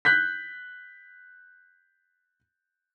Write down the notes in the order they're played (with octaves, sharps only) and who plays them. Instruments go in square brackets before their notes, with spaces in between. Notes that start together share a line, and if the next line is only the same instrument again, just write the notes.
[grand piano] F#6 G6 B6